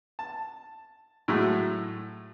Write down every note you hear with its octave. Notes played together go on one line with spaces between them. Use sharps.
A5
A2 F#3 G#3 A3